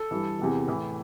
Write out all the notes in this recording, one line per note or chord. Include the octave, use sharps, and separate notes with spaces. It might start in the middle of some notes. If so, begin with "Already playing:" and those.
Already playing: A4
G2 E3
E2 C3 E3
A2 E3